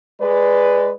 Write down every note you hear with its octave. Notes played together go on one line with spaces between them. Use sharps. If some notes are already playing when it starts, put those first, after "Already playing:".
G#3 B4 D5